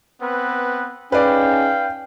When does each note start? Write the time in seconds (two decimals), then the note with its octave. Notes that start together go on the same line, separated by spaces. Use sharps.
0.21 B3 C4 B4
1.12 C#4 D#4 G#4 B4 D5 F5 G5